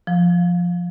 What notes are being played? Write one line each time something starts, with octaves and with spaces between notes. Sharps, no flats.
F3